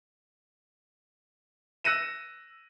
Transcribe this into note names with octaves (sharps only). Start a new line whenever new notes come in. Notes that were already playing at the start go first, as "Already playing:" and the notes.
E6 F#6 A#6 C#7 D#7 E7